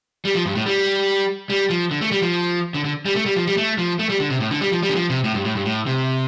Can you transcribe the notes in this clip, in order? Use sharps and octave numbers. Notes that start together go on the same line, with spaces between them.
G3
F3
G2
A2
G3
G3
F3
D3
A3
G3
F3
D3
D3
G3
A3
G3
F3
G3
A3
F3
A3
G3
D3
C3
A2
D3
G3
F3
G3
D3
F3
C3
A2
G2
A2
G2
A2
C3